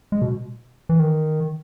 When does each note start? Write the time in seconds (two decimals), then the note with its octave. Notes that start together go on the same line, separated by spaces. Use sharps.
0.12 G#3
0.22 B2
0.89 E3
0.99 D#3